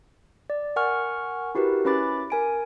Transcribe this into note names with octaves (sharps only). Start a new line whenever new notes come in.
D5
A#4 F#5 G#5 C#6 F6
E4 F#4 G4 A#4 B4
C#4 E4 B4 B5 D6 A6
A#4 G#5 D7